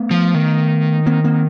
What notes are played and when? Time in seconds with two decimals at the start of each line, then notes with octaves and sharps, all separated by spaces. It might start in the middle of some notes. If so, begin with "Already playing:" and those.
Already playing: A3 B3
0.11 F3
0.34 D#3
1.06 A#3 C4
1.24 A#3 C4